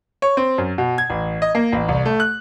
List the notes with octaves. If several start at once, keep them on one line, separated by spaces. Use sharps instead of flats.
C#5
C4
F#2
B2
G#6
A1
D#5
A#3
A1
C2
A3
F#6